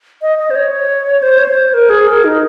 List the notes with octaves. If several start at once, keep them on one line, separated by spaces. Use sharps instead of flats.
D#5
D#5
C5
C#5
C5
C#5
C5
A#4
G#4
A#4
D#4